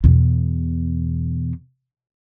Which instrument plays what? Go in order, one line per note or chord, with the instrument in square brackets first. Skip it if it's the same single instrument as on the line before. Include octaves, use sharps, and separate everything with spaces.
[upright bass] E2 B2